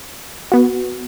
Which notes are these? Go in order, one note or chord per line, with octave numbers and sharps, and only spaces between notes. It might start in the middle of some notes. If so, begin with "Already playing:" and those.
B3 F#4